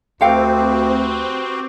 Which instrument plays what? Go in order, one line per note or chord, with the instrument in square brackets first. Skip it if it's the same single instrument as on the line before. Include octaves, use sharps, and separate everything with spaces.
[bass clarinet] D2 [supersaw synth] C4 [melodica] F#4 G4 B4 [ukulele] A4 F5 G5